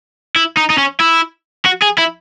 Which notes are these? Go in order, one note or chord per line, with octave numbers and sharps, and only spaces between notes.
E4
D#4
D#4
C#4
E4
F#4
G#4
E4